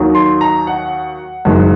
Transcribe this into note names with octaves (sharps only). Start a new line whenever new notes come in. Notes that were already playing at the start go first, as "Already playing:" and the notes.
Already playing: D#2 D#3 F#3
C6
A#5
F#5
F#1 F#2 D#3 G#3